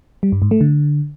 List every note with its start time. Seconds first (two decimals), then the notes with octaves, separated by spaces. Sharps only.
0.23 G3
0.32 G2
0.42 G#2
0.51 A3
0.61 D3